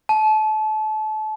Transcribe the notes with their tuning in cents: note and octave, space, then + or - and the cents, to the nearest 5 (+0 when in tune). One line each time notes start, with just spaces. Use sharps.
A5 -30